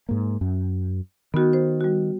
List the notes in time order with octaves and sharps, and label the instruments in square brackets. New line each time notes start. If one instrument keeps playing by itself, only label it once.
[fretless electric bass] G#2 A#3
F#2
[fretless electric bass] D#3 [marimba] B3 F#4
[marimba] C5
G3 F#4